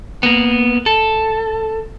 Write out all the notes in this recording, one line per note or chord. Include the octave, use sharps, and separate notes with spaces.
A#3 B3
A4